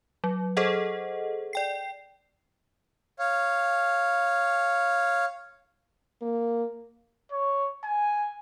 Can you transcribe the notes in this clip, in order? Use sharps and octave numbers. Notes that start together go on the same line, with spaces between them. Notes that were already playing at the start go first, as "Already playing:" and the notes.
F#3
G#4 A4 C5 D#5 F#5
D5 G5 C7
C#5 F5
A#3
C#5
G#5